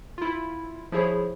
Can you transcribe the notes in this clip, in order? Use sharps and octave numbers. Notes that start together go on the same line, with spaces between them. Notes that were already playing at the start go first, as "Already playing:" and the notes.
E4 F4
F3 E4 G#4 C#5